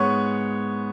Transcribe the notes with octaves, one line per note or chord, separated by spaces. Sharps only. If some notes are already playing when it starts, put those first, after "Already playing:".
Already playing: G#2 G#3 B3 C#5 C#6